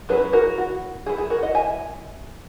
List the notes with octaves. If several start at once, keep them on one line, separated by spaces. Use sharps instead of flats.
F#3 C#4 E4 G#4 B4
F#4 A#4
F#4
F#3 B3 E4 G#4
G#4
F#4 A#4
D#5 F#5
E5 G#5